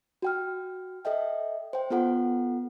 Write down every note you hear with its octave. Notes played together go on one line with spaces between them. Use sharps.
F#4 G5 F6
A4 D#5 E5 G5
C5 G5
B3 F4 A4 F#5